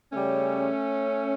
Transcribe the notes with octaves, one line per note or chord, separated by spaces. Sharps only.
C#3 G3 A3 C#4